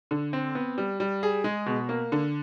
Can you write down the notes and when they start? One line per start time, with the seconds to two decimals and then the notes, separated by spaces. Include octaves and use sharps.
0.11 D3
0.33 C4
0.55 B3
0.78 G3
1.00 G3
1.23 G#4
1.44 G#3
1.66 B2
1.89 A#3
2.12 D3